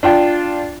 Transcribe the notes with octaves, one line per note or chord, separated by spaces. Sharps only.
D4 F4 G5